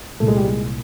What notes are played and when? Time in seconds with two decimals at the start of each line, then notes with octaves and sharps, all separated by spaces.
0.20 C2 A#2 A3
0.28 G#3
0.36 G3
0.45 G#3